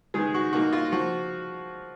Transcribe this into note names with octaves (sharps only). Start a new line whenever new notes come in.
D#3 G#3 B3 G#4
F#4
B2 A#3 D#4 F#4
F4
F3 F#4